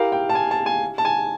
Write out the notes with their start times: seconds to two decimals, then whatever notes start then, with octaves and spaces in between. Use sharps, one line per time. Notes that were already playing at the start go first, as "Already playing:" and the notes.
Already playing: E4 G4 A#4 F5
0.12 G5
0.29 A5
0.35 G#5
0.51 A5
0.66 G#5
0.98 A5
1.05 G#5